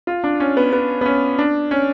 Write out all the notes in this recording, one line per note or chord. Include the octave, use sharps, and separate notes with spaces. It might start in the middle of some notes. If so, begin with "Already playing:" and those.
F4
D4
C#4
B3
B3
B3
C#4
D4
C#4